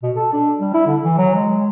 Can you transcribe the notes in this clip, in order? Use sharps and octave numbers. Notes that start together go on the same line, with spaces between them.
B2
A4
D4
G3
E4
D3
E3
F#3
G#3